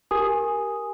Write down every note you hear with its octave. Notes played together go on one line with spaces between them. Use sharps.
G4 A#4 G#5 D#6